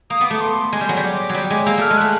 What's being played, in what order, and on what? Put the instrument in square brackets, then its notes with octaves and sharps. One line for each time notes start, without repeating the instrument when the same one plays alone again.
[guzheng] A#3 [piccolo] D#6
[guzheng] B3 [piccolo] D6
[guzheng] A3
[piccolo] C6
[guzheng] G#3
G3
F#3
G3
[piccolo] D6
[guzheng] F#3
G3
G#3
[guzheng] A#3 [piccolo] E6
[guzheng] A3 [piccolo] F6
[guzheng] G#3
[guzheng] A3 [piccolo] F#6